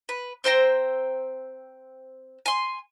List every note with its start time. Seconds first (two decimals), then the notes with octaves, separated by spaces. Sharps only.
0.09 B4
0.44 C4 C5 G5 A#5
2.46 G#5 C6